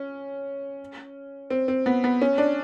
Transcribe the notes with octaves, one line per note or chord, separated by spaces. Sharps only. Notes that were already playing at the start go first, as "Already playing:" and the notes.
Already playing: C#4
C4
C4
B3
B3
C#4
D4